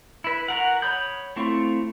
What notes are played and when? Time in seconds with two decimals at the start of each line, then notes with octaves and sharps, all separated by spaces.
0.24 E4 B4
0.48 F#4 A#4 F#5
0.82 C#5 B5 D#6 G6
1.36 A3 C4 E4 F4 C#6